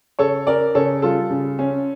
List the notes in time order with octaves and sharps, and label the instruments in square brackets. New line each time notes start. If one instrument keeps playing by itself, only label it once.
[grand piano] C#3 [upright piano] A4 C#5
[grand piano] C#4 [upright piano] A#4 D5
[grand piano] C#3 [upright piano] A4 C#5
[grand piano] G3 [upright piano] F4 A4
[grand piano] C#3
C#4